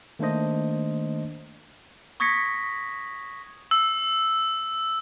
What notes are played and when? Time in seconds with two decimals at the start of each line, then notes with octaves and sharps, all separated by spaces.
0.19 D#3 A3 A#3 D4 C5 D#5
2.20 C#6 D#6 G#6 A#6 B6 C#7
3.71 E6